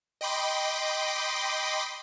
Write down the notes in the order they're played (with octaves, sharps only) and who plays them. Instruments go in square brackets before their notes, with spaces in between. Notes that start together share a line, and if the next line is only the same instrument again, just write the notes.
[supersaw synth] D#5 G5 B5 C6 D6